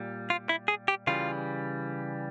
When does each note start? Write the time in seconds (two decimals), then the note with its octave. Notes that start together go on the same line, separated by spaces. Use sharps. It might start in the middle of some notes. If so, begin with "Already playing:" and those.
Already playing: A#2 G3
0.30 F4
0.49 E4
0.68 G#4
0.88 G4
1.07 C#3 E3 G3 F4